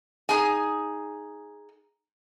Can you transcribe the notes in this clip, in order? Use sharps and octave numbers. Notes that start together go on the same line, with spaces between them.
D#4 G#4 G#5